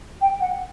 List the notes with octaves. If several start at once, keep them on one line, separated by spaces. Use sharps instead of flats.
G5
F#5